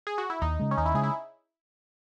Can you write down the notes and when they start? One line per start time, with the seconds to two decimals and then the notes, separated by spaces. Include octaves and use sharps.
0.07 G#4
0.18 F#4
0.30 E4
0.42 D#2 D#4
0.60 C#3 G#3
0.71 C#4
0.77 D#2 D#4
0.86 E4
0.94 C#3 G#3 G#4
1.04 E4